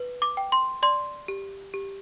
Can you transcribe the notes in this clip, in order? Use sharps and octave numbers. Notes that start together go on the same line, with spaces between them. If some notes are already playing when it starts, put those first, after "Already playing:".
Already playing: B4
D6
G5
C6
D5 C6
G4
G4